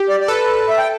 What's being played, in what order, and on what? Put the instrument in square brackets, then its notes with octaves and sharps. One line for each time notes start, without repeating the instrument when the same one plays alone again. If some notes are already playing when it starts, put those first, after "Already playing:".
Already playing: [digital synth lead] G4
[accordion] D5
D5
[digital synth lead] A4 [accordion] B4
[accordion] E5
G5